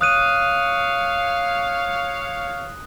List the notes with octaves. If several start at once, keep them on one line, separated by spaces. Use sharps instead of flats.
C#5 F5 D#6 F#6 D#7